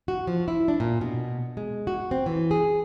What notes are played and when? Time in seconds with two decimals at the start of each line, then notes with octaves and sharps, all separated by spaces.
0.08 F#4
0.27 F3
0.48 E4
0.68 D4
0.80 A#2
1.01 B2
1.57 G#3
1.87 F#4
2.11 C4
2.26 E3
2.51 G#4